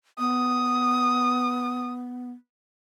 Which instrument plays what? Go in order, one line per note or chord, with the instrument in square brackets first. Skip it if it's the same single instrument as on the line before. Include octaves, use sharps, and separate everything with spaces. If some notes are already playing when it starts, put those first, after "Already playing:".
[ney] B3 [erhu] D#6